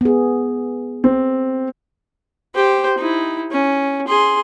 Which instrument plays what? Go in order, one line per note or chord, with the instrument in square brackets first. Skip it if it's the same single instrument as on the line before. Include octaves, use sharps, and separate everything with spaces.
[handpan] B3 G#4
[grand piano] C4
[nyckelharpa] G4 C5
D#4 E4
C#4
G#4 C6